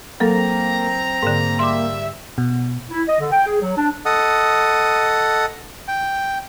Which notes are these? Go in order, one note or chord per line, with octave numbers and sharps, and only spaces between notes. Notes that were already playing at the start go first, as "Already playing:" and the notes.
F#3 A#3 C4 A4 A#5
G#2 D3 A#3
G3 E5 C6 D6
B2
E4
D#5
D3
G5
G#4
F#3
D4
A4 D#5 F#5 D#6
G5